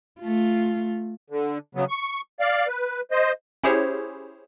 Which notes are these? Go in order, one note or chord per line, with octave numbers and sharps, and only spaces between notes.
A3 F4
D3
C#3 F#3 B3
C#6
D5 F5
B4
C5 D#5
C#4 E4 G4 G#4 C5 C#5